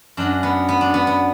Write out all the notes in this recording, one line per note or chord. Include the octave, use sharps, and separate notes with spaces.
F#2 F#3 D4
B3
B3
D4
B3
B3